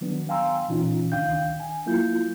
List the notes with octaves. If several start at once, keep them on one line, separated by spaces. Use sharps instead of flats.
D#3 F#3 B3 D4
F5 G5 G#5 A#5 C6 E6
A#2 E3 C#4 D#4 F4
C#2 D#3 D4 F5 G5 G6
G#5
F#3 A#3 E4 F4 G6